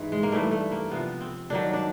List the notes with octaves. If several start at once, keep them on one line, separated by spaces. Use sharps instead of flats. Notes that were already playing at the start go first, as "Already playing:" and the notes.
Already playing: G#2 E3
G#3
A#3
G2 E3 G3 A3
A3
A#3
C3 F3 B3
C4
G2 D#3 F#3 D4
D4